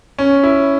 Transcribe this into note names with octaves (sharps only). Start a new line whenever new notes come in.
C#4
E4